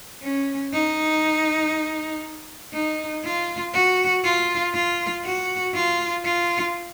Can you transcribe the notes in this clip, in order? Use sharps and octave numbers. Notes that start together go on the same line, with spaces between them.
C#4
D#4
D#4
F4
F#4
F4
F4
F#4
F4
F4